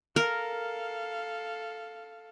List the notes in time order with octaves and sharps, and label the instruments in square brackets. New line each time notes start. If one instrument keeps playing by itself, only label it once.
[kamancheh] A4 F5 [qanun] A#4